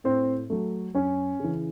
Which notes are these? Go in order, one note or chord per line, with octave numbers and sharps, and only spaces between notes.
A2 C4 C5
F#3 A3
F#2 C#4 C#5
C#3 E3